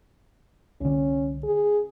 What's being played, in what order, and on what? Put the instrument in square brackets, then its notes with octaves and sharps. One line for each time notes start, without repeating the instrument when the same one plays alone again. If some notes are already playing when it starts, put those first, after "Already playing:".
[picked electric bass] C2 D3 [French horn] C#4
[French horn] G#4